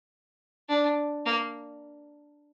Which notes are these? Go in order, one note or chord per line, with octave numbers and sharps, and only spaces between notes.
D4
A#3